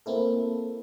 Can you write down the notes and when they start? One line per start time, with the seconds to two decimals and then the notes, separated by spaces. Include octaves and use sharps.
0.06 A#3 C4 E4 A4